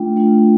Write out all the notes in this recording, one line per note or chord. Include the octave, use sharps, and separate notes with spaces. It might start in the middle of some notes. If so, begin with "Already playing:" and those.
Already playing: A3 D4 F4 G5
A3 D4 F4